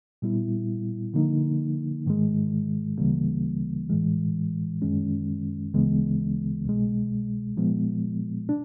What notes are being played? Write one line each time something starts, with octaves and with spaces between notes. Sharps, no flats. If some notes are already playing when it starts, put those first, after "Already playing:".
A#2 G3 B3 E4
D3 F3 A#3 D#4
G#2 D#3 G#3
D2 C#3 E3 G3 A#3
A2 E3 G#3
F#2 D#3 G#3 C#4
D2 C#3 E3 G#3 B3
C2 B2 G#3
A#2 F3 G#3 B3
D4